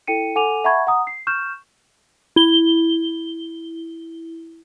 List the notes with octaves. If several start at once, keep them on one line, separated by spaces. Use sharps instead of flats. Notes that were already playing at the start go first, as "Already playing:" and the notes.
E4 A4 G5 C#7 D#7
A4 F#5 G#5 D6 D#7 F7
E5 F#5 A5 B5 C#6 G#6
F#5 A#5 D#6
C7
C#6 F6 G6 E7
E4 G7